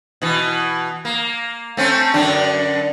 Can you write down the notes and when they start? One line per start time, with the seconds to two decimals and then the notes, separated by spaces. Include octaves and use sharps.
0.22 B2 E3
1.05 A#3
1.77 A3 C4 C#4
2.14 F#2 D3 D4